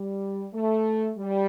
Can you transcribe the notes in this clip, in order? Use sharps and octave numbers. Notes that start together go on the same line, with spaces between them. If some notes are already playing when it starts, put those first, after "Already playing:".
Already playing: G3
A3
G3